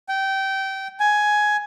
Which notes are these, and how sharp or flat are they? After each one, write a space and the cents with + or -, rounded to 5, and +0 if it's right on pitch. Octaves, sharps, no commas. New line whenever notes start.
G5 -20
G#5 +10